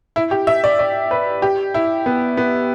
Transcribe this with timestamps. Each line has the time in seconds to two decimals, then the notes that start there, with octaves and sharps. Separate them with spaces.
0.16 E4
0.31 G4
0.47 E5
0.64 D5
0.79 D5
1.11 B4
1.42 G4
1.74 E4
2.06 B3
2.37 B3